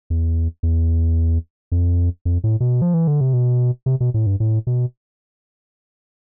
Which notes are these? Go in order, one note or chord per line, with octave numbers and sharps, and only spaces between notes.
E2
E2
F2
F2
A2
B2
F3
E3
D3
C3
B2
C3
B2
A2
G2
A2
B2